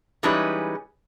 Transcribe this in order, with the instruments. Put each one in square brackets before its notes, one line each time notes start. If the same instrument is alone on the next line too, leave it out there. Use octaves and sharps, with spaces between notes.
[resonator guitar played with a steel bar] E3 G3 G#3 C#4 D#4 B4